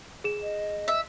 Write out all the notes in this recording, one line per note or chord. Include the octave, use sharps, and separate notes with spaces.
G#4 E7
D#5
E5